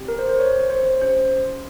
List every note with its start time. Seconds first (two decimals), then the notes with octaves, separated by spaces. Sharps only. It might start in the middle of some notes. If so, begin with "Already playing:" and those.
Already playing: C4 G4
0.08 A#4
0.19 C5
0.29 C5
0.39 C#5
0.70 C5
0.86 C5
1.02 C#4 G4 C5